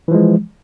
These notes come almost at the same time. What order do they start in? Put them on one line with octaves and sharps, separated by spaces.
E3 F3 G#3